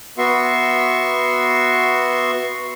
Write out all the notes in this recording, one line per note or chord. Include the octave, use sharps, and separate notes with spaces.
B3 F#4 E5 C6 C#6